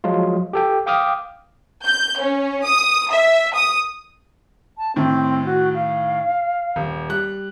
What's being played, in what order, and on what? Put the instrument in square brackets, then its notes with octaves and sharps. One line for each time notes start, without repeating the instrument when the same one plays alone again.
[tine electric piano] F3 F#3 G#3 F4
G4 A4 G5
F5 G5 D6 D#6 F6
[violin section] G6
C#4
D#6
E5
D#6
[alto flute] A5
[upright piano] A2 D#3 [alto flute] C4
[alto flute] F#4
F5
[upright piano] D#1
G3 F#6